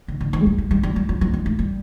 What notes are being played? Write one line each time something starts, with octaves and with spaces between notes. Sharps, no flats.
D3
D3
D#3
A3
G3
G3
G3
G3
G3
F#3
F#3
G3
A3
G3